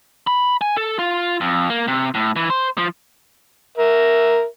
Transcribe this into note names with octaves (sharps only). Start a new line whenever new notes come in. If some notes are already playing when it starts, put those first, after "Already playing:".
B5
G#5
A4
F4
F2
A#3
C3
A2
E3
C5
F3
A#4 E5